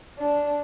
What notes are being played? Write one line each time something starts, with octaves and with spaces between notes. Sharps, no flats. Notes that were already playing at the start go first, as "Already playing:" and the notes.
D4